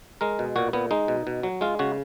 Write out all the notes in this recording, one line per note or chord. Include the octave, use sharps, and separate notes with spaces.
G#3 A#4
B2
A#2 F#4
A#2 B3
G#3 D#4
B2
B2
F#3
G#3 F4
C#3 F#4